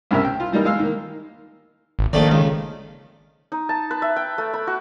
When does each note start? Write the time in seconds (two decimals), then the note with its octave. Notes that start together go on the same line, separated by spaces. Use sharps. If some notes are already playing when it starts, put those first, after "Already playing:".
0.11 C2 G2 C#3 A#4 E5
0.24 G5
0.40 F4
0.52 E3 G3 A#3 D#4
0.65 G#3 F5 E6
0.79 D#3 A#3
1.99 G#1
2.13 A#1 D#3 A3 D5
2.31 C#2
3.52 D#4
3.69 A5
3.91 B4
4.02 E5
4.16 G5
4.38 A3
4.54 B5
4.67 F#4